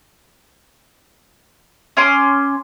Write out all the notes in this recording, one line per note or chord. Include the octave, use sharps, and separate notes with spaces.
C#4 C6 D6